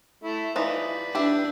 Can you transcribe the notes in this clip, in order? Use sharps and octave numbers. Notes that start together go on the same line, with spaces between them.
A3 E4
E3 F3 D#4 B4 D5
D4 E4 G4